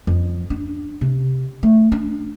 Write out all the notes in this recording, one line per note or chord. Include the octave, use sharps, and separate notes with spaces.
F2
D4
C3
A3
D4